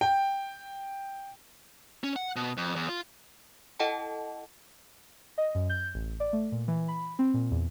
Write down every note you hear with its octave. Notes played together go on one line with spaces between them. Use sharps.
G5
C#4
F#5
B2
F2
E2
F4
E4 A4 D#5 F#5 G5 A5
D#5
F#2
G6
A1
D5
A3
A#2
E3
B5
C4
A#2
E2